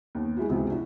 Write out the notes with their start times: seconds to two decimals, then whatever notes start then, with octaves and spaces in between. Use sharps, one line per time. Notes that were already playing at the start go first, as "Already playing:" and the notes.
0.15 D#2 B3
0.36 G#3 E4 F#4
0.49 C#2 C3 E3 B3 F#4
0.70 D4 E4 F#4